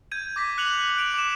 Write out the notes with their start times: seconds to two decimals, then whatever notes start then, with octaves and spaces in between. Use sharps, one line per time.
0.12 G6 G#6 D#7
0.36 D6 A#6 B6
0.58 F#6 C#7 F7 F#7
0.97 F#6 D7 F7
1.14 D6 E7